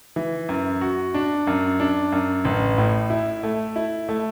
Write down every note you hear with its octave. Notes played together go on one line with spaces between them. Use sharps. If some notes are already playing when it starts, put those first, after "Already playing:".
E3
F#2
F#4
D4
F#2
D4
F#2
A1
A2
E4
A3
E4
A3